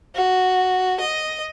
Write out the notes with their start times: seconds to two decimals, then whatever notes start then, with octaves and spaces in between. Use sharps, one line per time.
0.15 F#4
1.00 D#5